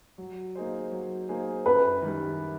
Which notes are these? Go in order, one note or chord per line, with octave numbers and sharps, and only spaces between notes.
F#3
A#3 D#4 G#4 C5
F#3
A#3 D#4 G#4 C5
F#2 B4
D#3 G3